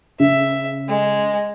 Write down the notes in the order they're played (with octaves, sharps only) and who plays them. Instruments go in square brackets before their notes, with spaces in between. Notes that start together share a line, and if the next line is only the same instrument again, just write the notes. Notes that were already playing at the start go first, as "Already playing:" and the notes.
[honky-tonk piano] C#3 [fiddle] E5
[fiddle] G#3